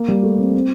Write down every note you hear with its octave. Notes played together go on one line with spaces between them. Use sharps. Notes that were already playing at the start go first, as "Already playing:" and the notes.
Already playing: A#3
G3
A3
C4
C4